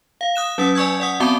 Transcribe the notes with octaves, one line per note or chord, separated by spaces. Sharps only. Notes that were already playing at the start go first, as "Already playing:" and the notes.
F5
D#6 F#6 E7
F#3 C#4 F#5 D#6
D5 G#5 C#6 E6 G#6
D5 F#5 D#6
B3 C4 F#4 D5 A5 G7